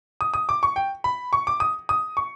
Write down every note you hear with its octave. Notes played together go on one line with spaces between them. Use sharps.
D#6
D#6
D6
C#6
G5
B5
C#6
D6
D#6
D#6
C#6